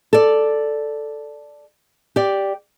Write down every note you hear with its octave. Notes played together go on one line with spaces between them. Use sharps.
A4 D5
G4 D5